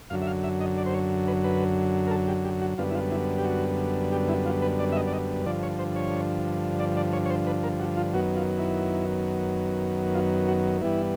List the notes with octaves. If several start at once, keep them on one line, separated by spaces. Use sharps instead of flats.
F#2 D3 F#3 F5
E5
F5
E5
D#5
D5
C5
C#5
B4
B4
A#4
A4
G4
G4
F#4
F#2 D3 G3 B3 F4
E4
F4
E4
G4
F#4
G4
E4
F4
B4
D5
E5
D#5
D5
D#5
G2 D3 F3 D5
C#5
C5
C#5
D5
D5
C#5
C#5
C5
B4
A#4
F#4
F4
F#2 D#3 F#3 B3 F#4
F4
E4
F4
F#4
G2 E3 G3 B3 E4